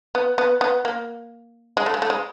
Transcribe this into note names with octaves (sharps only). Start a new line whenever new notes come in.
B3
B3
B3
A#3
G#3
A3
G#3
A3
G#3